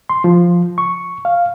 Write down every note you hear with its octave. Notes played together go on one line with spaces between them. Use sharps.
C6
F3
C#6
F5